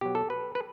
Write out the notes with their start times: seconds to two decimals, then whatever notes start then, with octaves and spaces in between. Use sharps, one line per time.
0.01 B2 F#3 G4
0.15 A4
0.30 B4
0.55 B4